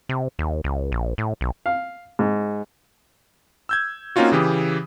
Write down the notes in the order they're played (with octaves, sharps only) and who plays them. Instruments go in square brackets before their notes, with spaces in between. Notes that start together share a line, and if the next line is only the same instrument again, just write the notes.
[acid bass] C3
D#2
C#2
A#1
A2
B1
[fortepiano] F5
G#2
[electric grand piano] E6 G6 G#6
A#3 C4 C#4 D#4 F4 F#4
C#3 E3 G4 D#6